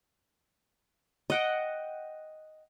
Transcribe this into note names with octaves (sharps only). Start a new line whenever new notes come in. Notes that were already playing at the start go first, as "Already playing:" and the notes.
D#5 F#5 G5